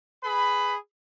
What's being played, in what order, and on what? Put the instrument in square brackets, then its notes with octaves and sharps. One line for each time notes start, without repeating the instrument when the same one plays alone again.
[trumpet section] G#4 B4 B5